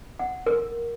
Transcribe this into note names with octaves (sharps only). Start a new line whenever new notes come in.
F#5
A#4